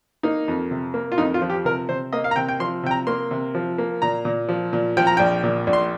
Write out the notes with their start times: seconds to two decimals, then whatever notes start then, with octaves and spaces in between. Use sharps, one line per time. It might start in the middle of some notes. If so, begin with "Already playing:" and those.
0.23 A#3 D#4
0.48 F2
0.71 C3
0.94 A#3
1.12 F4
1.18 F2 D#4
1.34 F4
1.42 F3
1.50 G4
1.65 C3 A#4
1.89 C3 C5
2.13 A#3 D#5
2.24 F5
2.31 A#5
2.36 C3 G5
2.49 G5
2.60 F3 C6
2.83 C3 G5
2.91 A#5
3.07 A#3 C6
3.31 C3
3.55 F3
3.78 A#3
4.02 A#2 A#5
4.25 A#2
4.48 F3
4.73 A#2
4.97 F3 G5
5.07 A#5
5.17 A#1 G5
5.44 A#2
5.67 A#1
5.73 C6